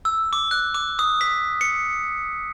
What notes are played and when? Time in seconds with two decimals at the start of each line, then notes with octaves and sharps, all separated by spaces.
0.05 E6
0.33 D6
0.51 F#6
0.74 D6
0.99 D#6
1.21 B6
1.61 C#7